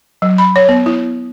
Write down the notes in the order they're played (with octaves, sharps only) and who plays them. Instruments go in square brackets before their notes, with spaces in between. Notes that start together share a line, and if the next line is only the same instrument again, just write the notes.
[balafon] F#3
B5
C#5
B3
E4